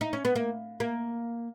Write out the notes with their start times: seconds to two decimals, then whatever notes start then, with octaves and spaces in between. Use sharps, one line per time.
0.01 D#4
0.13 C#4
0.25 B3
0.35 A#3
0.80 A#3